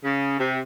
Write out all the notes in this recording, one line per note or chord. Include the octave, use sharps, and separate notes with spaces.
C#3
C3